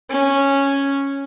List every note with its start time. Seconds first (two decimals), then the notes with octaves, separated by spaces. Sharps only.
0.10 C#4